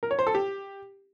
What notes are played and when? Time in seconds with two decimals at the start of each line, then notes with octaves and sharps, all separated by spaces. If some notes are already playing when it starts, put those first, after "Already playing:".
0.03 A#4
0.11 C#5
0.19 C5
0.27 A4
0.35 G4